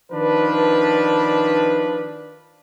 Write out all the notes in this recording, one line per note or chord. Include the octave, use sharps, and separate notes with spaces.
D#3 F3 D4 B4